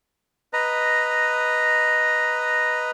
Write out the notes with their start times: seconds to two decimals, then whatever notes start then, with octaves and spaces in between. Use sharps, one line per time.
0.53 B4 D#5 A#5